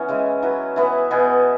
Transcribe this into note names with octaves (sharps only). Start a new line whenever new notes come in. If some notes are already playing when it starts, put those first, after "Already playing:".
Already playing: E3 B3 C#4
C#3 G#3 E4
F#3 E4 B4
E3 B3 E4 B4
B2 B3 G#4